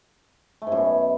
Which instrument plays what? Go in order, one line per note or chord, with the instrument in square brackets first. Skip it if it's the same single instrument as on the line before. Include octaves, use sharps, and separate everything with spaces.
[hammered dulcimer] A3
G#2
F#2
B2